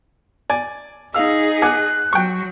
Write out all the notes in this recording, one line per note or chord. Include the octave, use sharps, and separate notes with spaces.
D5 G#5
D#4 G#4 F5 E6
F#5 G#5 D6 F#6
F#3 G5 C#6